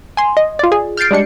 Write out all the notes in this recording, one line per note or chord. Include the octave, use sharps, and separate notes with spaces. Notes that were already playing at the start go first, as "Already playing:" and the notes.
G#5 C6
D#5
F4 D5
G#4
F6 G6 A6 C7 D7
G3 G#3 D4 C#7